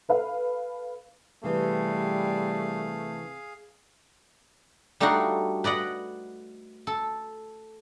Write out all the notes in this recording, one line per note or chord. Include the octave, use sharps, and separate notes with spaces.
A4 B4 F5
C3 E3 G3 A3 G#4 F5
G3 A3 D4 D#4 F4 F#4
B4 D5 D#5 F#5
A4